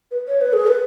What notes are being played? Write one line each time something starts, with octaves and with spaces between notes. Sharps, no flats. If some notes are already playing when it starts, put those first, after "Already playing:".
B4
C#5
B4
G#4
B4